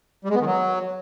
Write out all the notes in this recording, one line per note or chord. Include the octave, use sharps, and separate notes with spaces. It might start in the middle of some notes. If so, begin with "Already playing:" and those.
G3
G#3
B3
D#3
F#3